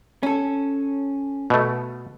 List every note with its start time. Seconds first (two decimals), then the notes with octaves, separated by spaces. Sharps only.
0.23 C#4 A4
1.50 B2 A3